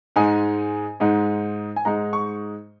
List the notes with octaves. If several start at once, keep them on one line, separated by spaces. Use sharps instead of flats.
G#2 G#3 D#4 G#5
G#2 G#3 D#4
G#5
G#2 G#3 D#4 A#5
C#6